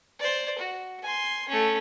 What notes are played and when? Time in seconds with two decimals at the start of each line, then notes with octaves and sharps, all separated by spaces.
0.19 C5 D5
0.58 F#4
1.02 G#5 C6
1.49 A3 C#4